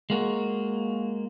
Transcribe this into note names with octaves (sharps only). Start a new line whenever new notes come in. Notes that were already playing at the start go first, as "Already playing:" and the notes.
G#3 A#3 F#4